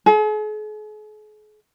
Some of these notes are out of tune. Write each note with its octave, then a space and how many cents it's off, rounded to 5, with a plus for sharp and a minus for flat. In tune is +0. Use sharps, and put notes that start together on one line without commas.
G#4 +45